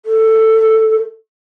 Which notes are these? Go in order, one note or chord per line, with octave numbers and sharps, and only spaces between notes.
A4